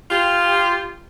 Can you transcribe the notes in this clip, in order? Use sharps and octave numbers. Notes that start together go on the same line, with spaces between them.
F4 G4